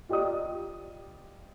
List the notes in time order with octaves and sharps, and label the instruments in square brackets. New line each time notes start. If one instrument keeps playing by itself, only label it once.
[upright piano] F4 G4 D5 D#5 D#6